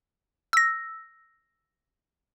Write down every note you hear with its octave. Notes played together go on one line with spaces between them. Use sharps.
E6 A#6